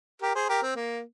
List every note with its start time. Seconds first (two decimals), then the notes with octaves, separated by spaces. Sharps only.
0.22 G4 A#4
0.35 G#4 C5
0.49 G4 A#4
0.62 C4
0.76 A#3